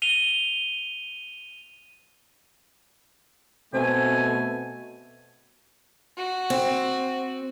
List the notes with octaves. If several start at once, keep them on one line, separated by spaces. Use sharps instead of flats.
D#7 F7 G7
B2 A3 C4 C5 G#5
F#4
C4